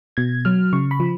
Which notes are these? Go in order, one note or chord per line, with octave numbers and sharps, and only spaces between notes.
B2 G#6
F#3 F6
C#3 C#6
B5
F3